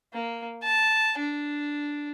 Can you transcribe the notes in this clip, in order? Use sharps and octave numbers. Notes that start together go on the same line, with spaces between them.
A#3
A5
D4